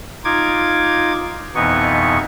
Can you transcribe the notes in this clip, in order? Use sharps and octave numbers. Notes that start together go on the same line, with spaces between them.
D#4 F4 D6 G#6
F2 B2 E3 B3 D#4 C#6